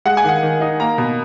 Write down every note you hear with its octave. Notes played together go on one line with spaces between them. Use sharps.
G#3 F#5
G#5
D#3 F#5
D#3
D#4
A#3 A#5
B2